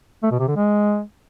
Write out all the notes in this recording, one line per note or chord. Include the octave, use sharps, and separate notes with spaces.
A3
B2
C3
D3
G#3